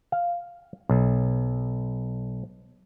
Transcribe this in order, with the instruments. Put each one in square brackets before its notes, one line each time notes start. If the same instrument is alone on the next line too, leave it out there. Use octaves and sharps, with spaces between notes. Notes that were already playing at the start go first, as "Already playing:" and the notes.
[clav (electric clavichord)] F5
B1